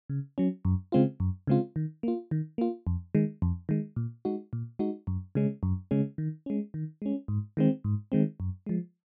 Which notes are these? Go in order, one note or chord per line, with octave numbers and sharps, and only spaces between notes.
C#3
F#3 C#4
F#2
C#3 G#3 C4 F4
F#2
C#3 G#3 C4 F4
D#3
A#3 F4
D#3
A#3 F4
F2
D#3 G#3
F2
D#3 G#3
A#2
G#3 D#4 F#4
A#2
G#3 D#4 F#4
F#2
C#3 G#3 C#4
F#2
C#3 G#3 C#4
D#3
G#3 C#4
D#3
G#3 C#4
G#2
D#3 G#3 C4
G#2
D#3 G#3 C4
F#2
F3 G#3